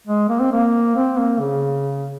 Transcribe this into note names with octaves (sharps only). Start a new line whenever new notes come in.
G#3
A#3
C4
A#3
C4
A#3
C#3